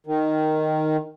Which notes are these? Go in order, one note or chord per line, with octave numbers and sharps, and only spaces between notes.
D#3